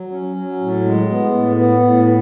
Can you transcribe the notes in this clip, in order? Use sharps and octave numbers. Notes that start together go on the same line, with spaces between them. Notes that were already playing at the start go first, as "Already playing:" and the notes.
Already playing: F#3
C#4
F#3
A2
G#3
B3
A2
B3
A2